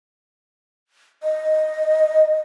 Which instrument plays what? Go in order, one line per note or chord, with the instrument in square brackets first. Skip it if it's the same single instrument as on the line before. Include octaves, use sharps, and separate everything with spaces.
[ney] D#5